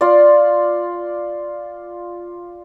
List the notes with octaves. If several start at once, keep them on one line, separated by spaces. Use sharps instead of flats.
F4 D5